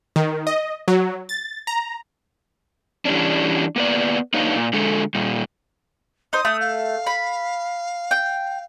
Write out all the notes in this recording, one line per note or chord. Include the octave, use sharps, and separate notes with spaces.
D#3
D#5
F#3
A6
A#5
E3 G3 B3 C#4 D4
A#3 B3 D5
A#3 D4 D#4 B4 C#5 F5
A#2
D3 G#3 A4
A#2 G3
D#4 C5 D#6
A3
F5
B5
G5